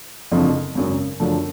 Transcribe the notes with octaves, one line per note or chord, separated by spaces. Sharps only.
F#1 F2 D3 F3
G#1 F#2 C#3
F#2 D3 F3 A3